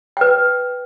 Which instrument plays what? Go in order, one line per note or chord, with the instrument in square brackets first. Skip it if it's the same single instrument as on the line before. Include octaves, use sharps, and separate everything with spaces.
[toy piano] B4 G5